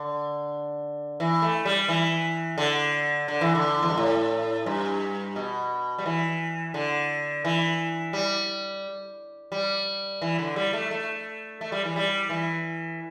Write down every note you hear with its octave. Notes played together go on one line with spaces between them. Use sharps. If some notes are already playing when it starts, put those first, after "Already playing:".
Already playing: D3
E3
A3
G3
E3
D3
D3
E3
D3
E2
G2
A2
G2
B2
G3
E3
D3
E3
G3
G3
E3
D3
G3
A3
A3
A3
G3
E3
G3
E3